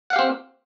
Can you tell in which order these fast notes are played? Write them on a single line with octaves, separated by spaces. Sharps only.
F#5 F5 G4 C4